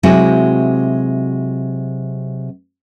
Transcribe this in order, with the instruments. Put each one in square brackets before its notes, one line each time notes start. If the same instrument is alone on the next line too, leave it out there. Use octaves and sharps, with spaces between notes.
[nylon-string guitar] C3 F#3 G#3 C4 E4 F#4